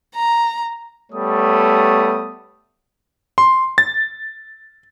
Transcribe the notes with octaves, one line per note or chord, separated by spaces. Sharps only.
A#5
G3 A3 B3 A4 C#5 D#6
C6
A6